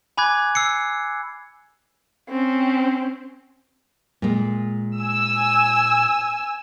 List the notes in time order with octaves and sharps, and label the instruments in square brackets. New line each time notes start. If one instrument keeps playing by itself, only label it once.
[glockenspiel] G#5 B5 D6 F#6 G#6
E6 C7 C#7
[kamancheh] C4 C#4
[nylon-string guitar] A#2 G#3
[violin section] G#5 E6